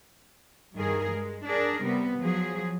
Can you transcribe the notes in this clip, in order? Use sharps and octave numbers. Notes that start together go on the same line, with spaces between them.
G2 D#3 G#4 A#4
G#3
D4 G#4 A#4
C3 G3 B3
F3 F#3 G#4